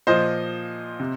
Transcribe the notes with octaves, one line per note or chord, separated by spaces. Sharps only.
A#2 F3 C5 D#5
C3